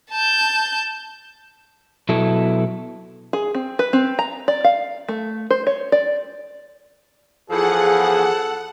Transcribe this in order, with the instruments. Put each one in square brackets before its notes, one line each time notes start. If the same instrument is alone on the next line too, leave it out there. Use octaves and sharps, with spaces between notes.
[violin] A5 G6
[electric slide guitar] B2 F#3 B3 E4 A4
[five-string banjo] G#4
C4
B4
C4
A#5
D5
F5
A3
C5
C#5
D5
[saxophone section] E2 F3 [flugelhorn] G#4 [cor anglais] A4 [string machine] F#5